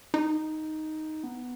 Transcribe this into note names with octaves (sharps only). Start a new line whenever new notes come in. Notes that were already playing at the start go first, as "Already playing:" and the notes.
D#4
B3